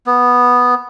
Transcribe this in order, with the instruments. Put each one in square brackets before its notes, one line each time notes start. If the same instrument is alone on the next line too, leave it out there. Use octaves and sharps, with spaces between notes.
[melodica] B3